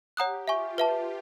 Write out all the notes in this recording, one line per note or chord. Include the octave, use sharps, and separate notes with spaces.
G4 C#5 F#5 A#5 D#6 F#6
F4 E5 G#5 C#6
B4 E5 A5